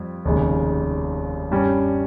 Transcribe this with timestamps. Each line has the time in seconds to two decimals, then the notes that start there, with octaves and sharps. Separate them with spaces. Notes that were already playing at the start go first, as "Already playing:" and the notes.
Already playing: F2 G3
0.25 F1 D#2 C#3 G#3
1.51 G2 G3 C#4